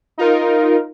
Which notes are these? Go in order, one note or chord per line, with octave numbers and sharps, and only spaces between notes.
D#4 F4 A#4